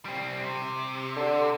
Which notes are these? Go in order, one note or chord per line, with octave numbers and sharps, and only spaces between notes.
G3 C4
C3
D3